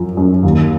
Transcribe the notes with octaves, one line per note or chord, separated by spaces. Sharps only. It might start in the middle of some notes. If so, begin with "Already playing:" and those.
Already playing: F#2 F3
F#2
D#2